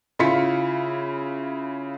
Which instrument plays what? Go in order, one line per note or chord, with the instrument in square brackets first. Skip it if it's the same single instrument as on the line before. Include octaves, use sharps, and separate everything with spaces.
[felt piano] C#3 E4 F4 C6 B6 C#7